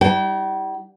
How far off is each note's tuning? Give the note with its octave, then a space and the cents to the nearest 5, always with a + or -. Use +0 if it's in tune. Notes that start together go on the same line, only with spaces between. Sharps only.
G3 +0 E4 -40 G5 -40